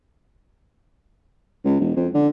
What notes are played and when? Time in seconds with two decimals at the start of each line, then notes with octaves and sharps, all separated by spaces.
1.65 C#2
1.80 E1
1.96 F2
2.14 D3